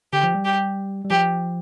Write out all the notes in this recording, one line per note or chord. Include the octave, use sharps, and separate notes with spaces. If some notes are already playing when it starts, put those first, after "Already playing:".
D3 G4
F3
G3
G4
G3
F3 G4